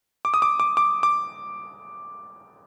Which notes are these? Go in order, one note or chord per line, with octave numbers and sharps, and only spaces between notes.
D6
D#6
D6
D6
D6
D6